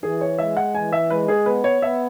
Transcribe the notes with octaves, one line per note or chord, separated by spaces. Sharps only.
E3 G#4
C#5
G#3 E5
F#5
E3 G#5
E5
G#3 B4
G#4
B3 B4
C#5
B3 E5